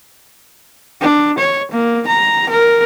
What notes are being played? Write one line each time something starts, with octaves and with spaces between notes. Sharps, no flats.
D4
C#5
A#3
A#5
A#4